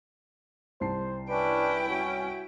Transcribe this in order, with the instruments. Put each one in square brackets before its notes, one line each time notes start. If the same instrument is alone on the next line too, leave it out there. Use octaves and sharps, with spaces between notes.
[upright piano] C2 A5 C7 [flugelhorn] C5
[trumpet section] C#4 D4 [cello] E4 G5 [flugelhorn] B4
[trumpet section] C#4 [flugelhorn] F#4